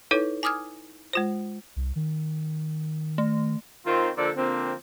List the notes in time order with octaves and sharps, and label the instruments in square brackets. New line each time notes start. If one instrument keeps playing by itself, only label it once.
[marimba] D#4 E4 A4 B4 C#5
G#5 D6 D#6 F6 G#6
G#3 F4 C5
[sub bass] C2
D#3
[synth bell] A3
[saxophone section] D#3 C4 F4
D3 F3 A#3 A4 C5 D5
D3 F3 A#3 C4